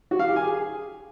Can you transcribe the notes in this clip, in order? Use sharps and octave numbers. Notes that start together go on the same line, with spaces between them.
F#4
F5
G4
G#5
G#4